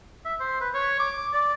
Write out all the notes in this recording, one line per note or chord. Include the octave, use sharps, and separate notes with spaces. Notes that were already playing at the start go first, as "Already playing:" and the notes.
E5
C5
B4
C#5
D6
D5